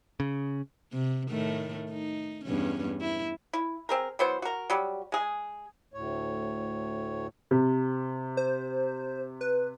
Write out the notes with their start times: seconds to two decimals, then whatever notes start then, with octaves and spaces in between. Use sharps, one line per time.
0.20 C#3
0.93 C3
1.30 A2 D#3 A3
1.91 D#4
2.45 E2 G2 C#4
3.01 E4
3.53 E4
3.89 C4 G#4 A#4
4.19 E3 F#3 B3 C5
4.42 F#4 A#4
4.70 F#3 G3
5.12 G#3 G#4
5.94 D2 A2 C#5
7.51 C3
8.37 C5
9.41 B4